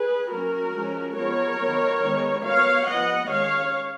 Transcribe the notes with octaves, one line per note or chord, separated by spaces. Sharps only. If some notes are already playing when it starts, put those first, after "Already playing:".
Already playing: G#4 B4
F#3 A#3 C#4 F#4 A#4
F3 G#3 C#4
F3 G#3 B3 A#4 C#5
D#3 F#3 B3
D#3 G#3 B3
F#3 B3 C#5 F5
F3 B3 D#5 F#5
D#3 G#3 C#4 C#5 F5